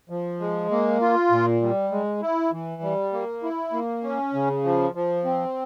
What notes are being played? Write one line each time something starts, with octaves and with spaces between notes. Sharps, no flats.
F3
G#3
A#3
F4
A#2
G3
G#3
E4
E3
G3
A#3
E4
A#3
C#4
C#3
F3
F3
C4